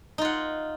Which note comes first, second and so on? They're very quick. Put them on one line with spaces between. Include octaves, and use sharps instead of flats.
D#4 F4 F#5